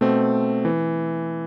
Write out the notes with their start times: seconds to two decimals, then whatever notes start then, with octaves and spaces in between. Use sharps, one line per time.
0.01 B2 A3 C4
0.65 E3